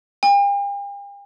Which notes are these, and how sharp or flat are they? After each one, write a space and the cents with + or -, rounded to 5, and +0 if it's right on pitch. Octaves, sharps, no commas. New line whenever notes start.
G5 +45